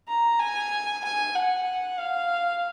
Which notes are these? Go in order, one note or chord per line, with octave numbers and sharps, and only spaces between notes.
A#5
G#5
G#5
F#5
F5